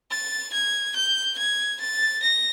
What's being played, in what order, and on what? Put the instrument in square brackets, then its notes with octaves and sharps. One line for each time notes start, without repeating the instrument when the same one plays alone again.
[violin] A6
G#6
G6
G#6
A6
A#6